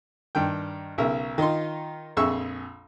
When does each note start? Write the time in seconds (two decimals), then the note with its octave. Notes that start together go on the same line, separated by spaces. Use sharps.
0.35 G2 D#3 G5
0.98 B1 C#3 A#4 E5
1.38 D#3 D#4 F4 C6
2.17 A#1 F2 G#4 E5 C#6 E6